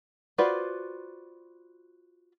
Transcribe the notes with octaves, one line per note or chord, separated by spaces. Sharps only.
F4 F#4 B4 C5 D5